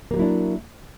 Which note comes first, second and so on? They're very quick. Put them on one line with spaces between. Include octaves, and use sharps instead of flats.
A#3 G3 F#3 E4 D4